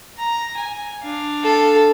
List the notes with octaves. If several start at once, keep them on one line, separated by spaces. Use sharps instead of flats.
A#5
G#5
D4 F5
A4